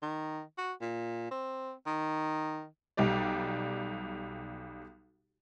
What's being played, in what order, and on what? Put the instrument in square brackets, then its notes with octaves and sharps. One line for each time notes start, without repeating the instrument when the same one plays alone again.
[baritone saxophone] D#3
F#4
A#2
C4
D#3
[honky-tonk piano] B1 G3 G4 D5